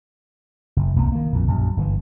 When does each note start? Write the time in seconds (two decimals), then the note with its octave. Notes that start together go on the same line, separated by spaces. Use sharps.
0.76 F#1
0.96 D#1 C2 A3 B3
1.12 D#3 A#3
1.32 A#1 F2
1.47 A#1 F#2
1.77 G1 D#3 E3